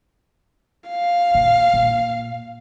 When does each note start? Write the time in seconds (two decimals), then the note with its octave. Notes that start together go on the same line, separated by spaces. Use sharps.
0.90 F5
1.35 A#2
1.74 A#2